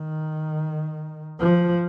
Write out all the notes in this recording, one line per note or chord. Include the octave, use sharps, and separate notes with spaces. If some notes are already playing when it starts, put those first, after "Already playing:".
Already playing: D#3
F3